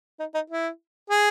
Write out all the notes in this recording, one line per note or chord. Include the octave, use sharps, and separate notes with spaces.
D#4
D#4
E4
G#4